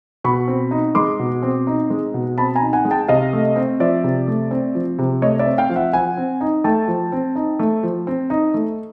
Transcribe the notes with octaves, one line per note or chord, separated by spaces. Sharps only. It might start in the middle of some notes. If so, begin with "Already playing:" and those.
B2 B5 C#6
C4
D#4
G#3 C6 D6
B2
C4
D#4
G#3
B2
C4 A5 B5
G#5 A#5
D#4
F#5 G#5
G#3
G5 A5
C3 D#5 F5
A3
C4
F3 D5 E5
C3
A3
C4
F3
C3
A3 C#5 D#5
D5 E5
C4
F5 G5
F3
E5 F#5
F3 F#5 G#5
C4
D#4
A3 G5 A5
F3
C4
D#4
A3
F3
C4
D#4
A3